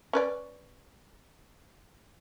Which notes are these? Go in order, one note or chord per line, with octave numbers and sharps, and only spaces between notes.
C#4 B4 D5